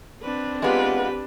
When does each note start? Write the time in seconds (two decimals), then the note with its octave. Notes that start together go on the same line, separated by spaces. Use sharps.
0.22 C4 D4 B4
0.62 G#3 B3 F4 G4 B4